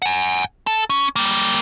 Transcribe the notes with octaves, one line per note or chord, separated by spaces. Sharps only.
F#5 G#5
A4 A5
C#4
G3 A#3